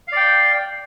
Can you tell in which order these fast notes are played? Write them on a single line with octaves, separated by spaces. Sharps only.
F5 D5 G5